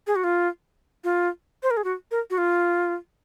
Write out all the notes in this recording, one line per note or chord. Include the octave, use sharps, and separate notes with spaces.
G#4
F#4
F4
F4
C5
A#4
G#4
F#4
A#4
F#4
F4